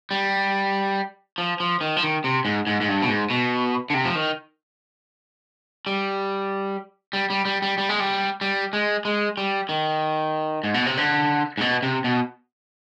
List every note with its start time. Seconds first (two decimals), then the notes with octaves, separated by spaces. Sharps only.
0.11 G3
1.38 F3
1.60 F3
1.81 D#3
1.97 F3
2.02 D#3
2.24 C3
2.45 G#2
2.67 G#2
2.81 G#2
2.88 G2
3.02 B2
3.08 G#2
3.30 B2
3.90 D3
3.94 C3
4.05 F3
4.15 D#3
5.87 G3
7.13 G3
7.30 G3
7.45 G3
7.62 G3
7.78 G3
7.89 G#3
8.00 G3
8.41 G3
8.73 G#3
9.05 G#3
9.37 G3
9.69 D#3
10.64 G#2
10.74 B2
10.86 C3
10.97 D3
11.58 G#2
11.61 B2
11.83 C3
12.04 B2